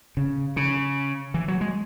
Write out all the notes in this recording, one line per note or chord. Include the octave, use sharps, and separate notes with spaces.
C#3
C#3
E3
F#3
G#3